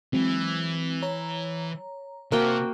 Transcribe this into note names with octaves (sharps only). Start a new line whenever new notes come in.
E3 F#3 G#3 C4
C#5 A#5
C3 A#3 F#4 C5 G5 A5